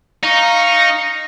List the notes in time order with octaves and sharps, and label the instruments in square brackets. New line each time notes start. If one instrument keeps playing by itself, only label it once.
[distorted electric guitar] D#4 [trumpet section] F5 C#6